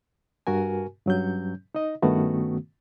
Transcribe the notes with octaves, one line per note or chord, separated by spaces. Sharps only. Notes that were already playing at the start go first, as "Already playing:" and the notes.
G2 F#4 A#4 G#5
G2 F#3 C#4 G6
D#4 D#5
G2 D#3 A3 B3 C#4 F#4